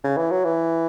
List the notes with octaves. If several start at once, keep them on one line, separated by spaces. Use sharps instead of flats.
C#3
E3
F#3
E3